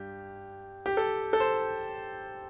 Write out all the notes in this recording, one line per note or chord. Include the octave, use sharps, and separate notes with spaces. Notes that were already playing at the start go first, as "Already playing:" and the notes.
Already playing: G2 G4
G4
A4
A4
C5